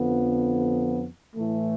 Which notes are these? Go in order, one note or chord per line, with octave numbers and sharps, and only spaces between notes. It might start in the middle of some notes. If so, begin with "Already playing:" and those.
Already playing: F2 D3 F3 B3
A2 E3 A3